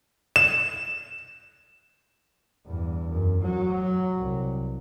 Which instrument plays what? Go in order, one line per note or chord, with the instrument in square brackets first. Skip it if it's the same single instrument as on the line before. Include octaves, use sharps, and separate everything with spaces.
[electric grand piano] E7
[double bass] E2 G2
F#2
F#3
C2